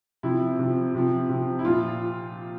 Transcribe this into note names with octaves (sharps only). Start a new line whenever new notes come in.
C3 F3 E4
C3 F3
C3 F3
C3 F3
E4
A#2 F3 F4